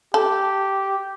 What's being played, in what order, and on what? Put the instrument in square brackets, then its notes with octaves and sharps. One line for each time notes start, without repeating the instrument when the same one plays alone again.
[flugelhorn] G4 [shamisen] A4